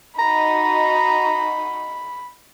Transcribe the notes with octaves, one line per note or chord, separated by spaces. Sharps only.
D#4 F#4 A#5 B5